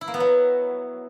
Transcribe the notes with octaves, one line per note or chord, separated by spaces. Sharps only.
E4
A#3
B3
F#3